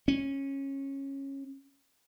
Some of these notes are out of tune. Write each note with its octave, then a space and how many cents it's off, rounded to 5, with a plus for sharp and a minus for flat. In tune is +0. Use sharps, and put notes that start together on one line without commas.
C#4 -20